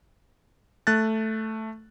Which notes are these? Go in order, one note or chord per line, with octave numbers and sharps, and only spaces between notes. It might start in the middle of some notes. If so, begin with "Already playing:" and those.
A3 F#6 A6